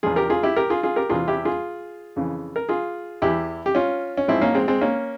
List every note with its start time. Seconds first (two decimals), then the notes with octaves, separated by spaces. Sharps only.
0.03 E2 C#3 F3 F4 G#4
0.16 G4 A#4
0.30 F4 G#4
0.43 E4 G4
0.56 G4 A#4
0.70 F4 G#4
0.83 F4 G#4
0.96 G4 A#4
1.09 E2 C3 E3 F4 G#4
1.28 E4 G4
1.45 F4 G#4
2.16 F2 C#3 E3
2.56 A#4
2.69 F4 G#4
3.22 E2 E3 E4 G4
3.66 G4
3.75 C#4 F4
4.17 C#4
4.28 G#1 G#2 F3 C4 E4
4.42 A#3 C#4
4.55 G#3 C4
4.68 G#3 C4
4.81 A#3 C#4